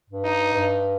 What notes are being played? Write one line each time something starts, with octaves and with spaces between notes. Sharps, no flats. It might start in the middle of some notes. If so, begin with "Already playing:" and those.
G2
D#4
G2